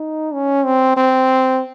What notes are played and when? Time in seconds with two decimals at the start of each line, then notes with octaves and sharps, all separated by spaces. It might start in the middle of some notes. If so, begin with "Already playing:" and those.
Already playing: D#4
0.34 C#4
0.65 C4
0.97 C4